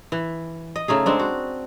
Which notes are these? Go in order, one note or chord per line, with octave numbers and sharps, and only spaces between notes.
E3
D#5
C#3 A3 D#4 G#4
G#3 C4 D4
F#4